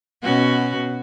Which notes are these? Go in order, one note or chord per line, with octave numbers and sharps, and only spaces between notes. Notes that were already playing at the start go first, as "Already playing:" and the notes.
B2 C#4 F#4